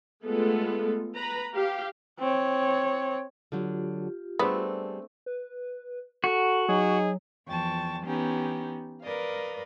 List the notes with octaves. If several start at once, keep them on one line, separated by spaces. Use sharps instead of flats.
G#3 A3 B3 F4 A4
B4 A#5 B5
G4 F5
C4 C#5
D3 F#3 F4 G4
G3 A3 B3 C4 D4 G#4 A4
B4
F#4 A4 F#5
F#3 D#4 G#4
E2 F3 G5 A5 C#6
E3 B3 C#4 D#4 G4
A#4 B4 D5 D#5 F5